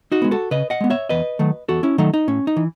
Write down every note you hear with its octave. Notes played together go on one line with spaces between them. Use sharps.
D#4 F#4
G#3 B3
F#4 A4
C#3 B4 D#5
D#5 F#5
G#3 B3
C#5 E5
E2 B4 D#5
D#3 F#3 A3
E2 F#4 A4
C#4 E4
D#3 F#3 A3 D#4
D#4
A2 C#4
D#4
E3